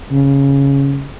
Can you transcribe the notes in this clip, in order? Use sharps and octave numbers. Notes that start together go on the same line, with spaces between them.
C#3